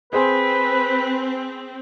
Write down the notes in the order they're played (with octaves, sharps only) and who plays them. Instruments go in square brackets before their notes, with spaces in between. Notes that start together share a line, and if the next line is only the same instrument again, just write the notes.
[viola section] C4 [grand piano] G#4 C5 G#5 [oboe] B4